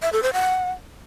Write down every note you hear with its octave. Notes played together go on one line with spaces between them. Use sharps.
E5
A4
C5
F#5